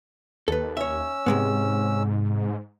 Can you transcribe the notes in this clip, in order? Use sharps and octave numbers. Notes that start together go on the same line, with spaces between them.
D#2 A4 B4
C#4 C#5 E5 E6
G#2 C3 G#3 B3